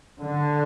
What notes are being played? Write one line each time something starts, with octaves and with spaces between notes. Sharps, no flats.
D3